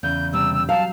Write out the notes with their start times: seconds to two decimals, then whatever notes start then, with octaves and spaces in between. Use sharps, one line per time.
0.03 E2 C#3 G6
0.33 C3 G3 E6
0.53 E6
0.69 F#3 F5 A5